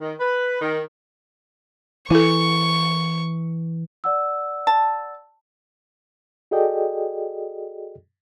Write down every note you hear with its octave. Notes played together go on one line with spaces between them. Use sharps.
D#3
B4
D#3
E3 E4 A4 C#6
D5 F#5 E6
A5
F#4 G#4 A4 D5 D#5 G5